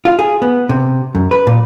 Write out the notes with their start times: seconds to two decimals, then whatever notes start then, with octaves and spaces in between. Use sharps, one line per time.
0.05 F4
0.19 G#4
0.42 B3
0.69 C3
1.15 F#2
1.31 B4
1.47 A#2